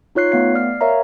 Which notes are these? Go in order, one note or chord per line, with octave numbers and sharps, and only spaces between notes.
D#4 F4 C#5 F#6 C7
A3 B3 F5 C7
D5 F6 C7
A#4 C#5 E5 F5 A#5